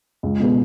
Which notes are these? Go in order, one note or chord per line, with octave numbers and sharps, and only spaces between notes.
C#2
B2 G#3 B3